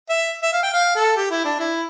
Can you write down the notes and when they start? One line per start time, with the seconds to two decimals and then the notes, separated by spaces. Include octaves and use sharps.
0.09 E5
0.42 E5
0.53 F5
0.63 G5
0.74 F5
0.96 A4
1.17 G4
1.30 E4
1.44 D4
1.59 E4